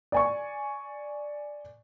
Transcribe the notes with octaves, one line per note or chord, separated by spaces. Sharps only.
D5 G#5 C#6